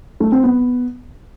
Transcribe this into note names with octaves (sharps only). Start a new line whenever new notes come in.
A3
C4
B3